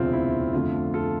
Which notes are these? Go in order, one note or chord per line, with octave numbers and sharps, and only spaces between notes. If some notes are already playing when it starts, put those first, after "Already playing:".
Already playing: E1 D2 C3 F3 C4 F4
E4
F2 D3 A3 F4
F4 A4